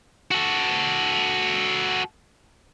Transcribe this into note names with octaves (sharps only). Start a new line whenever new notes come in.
F#4 A4